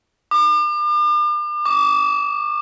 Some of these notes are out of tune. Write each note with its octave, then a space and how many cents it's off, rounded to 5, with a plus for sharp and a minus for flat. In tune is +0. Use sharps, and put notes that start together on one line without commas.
D6 +40
D6 -35